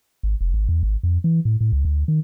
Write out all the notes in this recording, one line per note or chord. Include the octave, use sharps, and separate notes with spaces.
G#1
F1
G#1
E2
G#1
F2
E3
A2
A2
C#2
D2
D#3